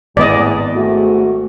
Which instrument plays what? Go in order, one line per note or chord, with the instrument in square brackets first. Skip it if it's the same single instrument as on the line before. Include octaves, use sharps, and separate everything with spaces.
[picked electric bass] G#1 B3 [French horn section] E2 A2 [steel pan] D5 D#5
[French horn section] G#2 D#3 A3 [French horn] F#4